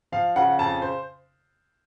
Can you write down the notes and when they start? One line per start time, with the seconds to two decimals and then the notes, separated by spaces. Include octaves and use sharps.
0.12 F3 F5
0.36 C#3 F#5
0.59 F2 A5
0.82 C5